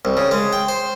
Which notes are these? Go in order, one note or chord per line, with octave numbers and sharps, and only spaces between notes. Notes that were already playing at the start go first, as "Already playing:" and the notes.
C2
C#3
G#3
G5
C5